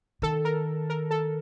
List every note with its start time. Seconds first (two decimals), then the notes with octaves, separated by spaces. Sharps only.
0.22 D#3 A4
0.45 A#4
0.90 A#4
1.11 A4